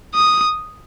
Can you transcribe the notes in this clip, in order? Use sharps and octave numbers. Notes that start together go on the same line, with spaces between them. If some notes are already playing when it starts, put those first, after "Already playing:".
D#6